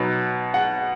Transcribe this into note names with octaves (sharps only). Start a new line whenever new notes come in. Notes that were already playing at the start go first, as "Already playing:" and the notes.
Already playing: B2 F#3 B3 D#4
F#5